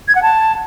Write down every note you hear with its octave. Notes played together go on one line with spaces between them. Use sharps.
G#6
F#5
A5